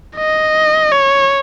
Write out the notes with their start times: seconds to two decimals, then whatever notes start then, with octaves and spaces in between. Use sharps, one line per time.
0.16 D#5
0.92 C#5